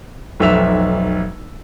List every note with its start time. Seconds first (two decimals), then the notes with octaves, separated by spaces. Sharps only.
0.40 F1 B1 B4 E5 E6 F7